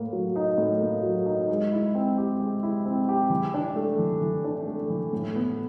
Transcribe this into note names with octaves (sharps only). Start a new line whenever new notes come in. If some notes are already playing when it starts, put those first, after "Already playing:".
Already playing: A2 A#3
F#3
D#4
A2
A#3
F#3
D#4
G#3
E4
C4
G4
G#3
E4
C4
G4
E3
D4
A3
E3
E3
D4
A3
E3
A2
B3